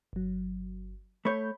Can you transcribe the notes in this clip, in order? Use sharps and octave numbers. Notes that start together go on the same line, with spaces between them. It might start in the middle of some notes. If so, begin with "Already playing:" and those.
G1 F#3
A3 C#5 B5 G6